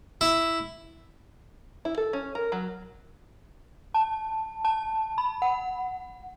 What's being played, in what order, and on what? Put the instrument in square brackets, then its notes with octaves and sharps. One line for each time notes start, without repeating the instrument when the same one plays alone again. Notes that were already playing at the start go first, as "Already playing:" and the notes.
[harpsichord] E4
[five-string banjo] E4
A4
C#4
A#4
F#3
[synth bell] A5
A5
B5
F#5